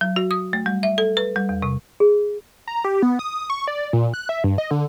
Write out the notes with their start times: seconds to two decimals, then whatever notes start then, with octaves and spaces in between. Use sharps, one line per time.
0.01 F#3
0.16 F#4
0.31 D#6
0.53 A3
0.66 G3
0.83 E5
0.98 A4
1.17 B4
1.36 G3
1.49 E2
1.62 C3
2.00 G#4
2.67 A#5
2.84 G4
3.02 B3
3.19 D#6
3.50 C#6
3.68 D5
3.93 A#2
4.14 F#6
4.29 E5
4.44 G2
4.58 D#5
4.71 D3